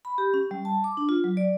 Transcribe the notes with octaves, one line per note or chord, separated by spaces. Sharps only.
B5
G4
C#4
G3
A5
D6
D4
F4
F#3
D5